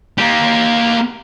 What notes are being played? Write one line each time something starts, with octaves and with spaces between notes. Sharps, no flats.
A#3 G4